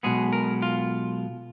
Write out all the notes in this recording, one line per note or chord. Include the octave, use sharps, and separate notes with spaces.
B1 B2 G#3 B3 G#4
A#4
F4